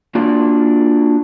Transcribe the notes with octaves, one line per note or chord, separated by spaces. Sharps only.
A#3 D4 F4 F#4